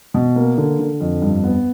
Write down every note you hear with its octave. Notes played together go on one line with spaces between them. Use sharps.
B2
A#3
D3
D3
F2
G2
B3